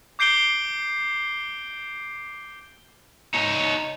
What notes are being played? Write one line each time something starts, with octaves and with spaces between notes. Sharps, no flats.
D6 G6 C7 D7 G7
D#4 C#5